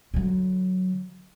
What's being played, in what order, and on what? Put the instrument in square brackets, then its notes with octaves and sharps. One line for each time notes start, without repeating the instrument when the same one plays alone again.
[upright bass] D3 F#3